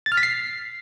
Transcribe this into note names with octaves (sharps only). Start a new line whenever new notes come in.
A6
F6
B6
C7